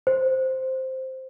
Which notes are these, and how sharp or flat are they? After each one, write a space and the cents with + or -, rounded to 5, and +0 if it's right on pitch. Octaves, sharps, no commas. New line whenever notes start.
C5 +0